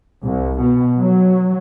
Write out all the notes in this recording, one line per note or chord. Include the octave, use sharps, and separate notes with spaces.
C2
B2
F#3